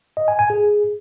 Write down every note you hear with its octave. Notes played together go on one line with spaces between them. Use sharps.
D#5
G#5
G#5
G#4